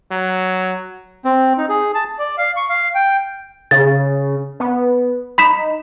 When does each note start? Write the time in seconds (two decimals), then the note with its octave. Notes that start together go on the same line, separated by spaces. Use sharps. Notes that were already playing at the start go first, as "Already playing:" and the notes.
0.11 F#3
1.25 C4
1.58 D#4
1.69 G#4
1.95 A5
2.19 D5
2.38 F5
2.57 C#6
2.69 F5
2.95 G5
3.71 C#3 A6
4.60 B3
5.38 D#4 B5 B6 E7